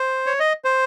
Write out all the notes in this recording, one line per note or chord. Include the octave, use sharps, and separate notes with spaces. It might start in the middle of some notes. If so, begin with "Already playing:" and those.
Already playing: C5
C#5
D#5
C5